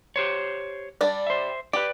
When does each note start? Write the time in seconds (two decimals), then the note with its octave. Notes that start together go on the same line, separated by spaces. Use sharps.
0.16 G4 C5 C#5
1.01 G3 D4 D5
1.27 C5 E5
1.73 G4 B4 D5